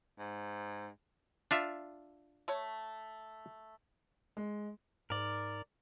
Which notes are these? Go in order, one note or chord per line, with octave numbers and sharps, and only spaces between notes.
G#2
D4 F4 E5
A3 C#5
G#3
G#2 A#4 D5